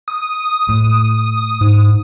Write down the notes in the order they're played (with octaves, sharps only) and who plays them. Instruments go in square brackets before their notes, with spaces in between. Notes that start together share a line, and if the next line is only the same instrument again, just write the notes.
[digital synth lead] D#6
[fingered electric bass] A2
[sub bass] G#2